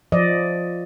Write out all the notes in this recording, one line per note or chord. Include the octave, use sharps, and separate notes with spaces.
F3 D5 D#5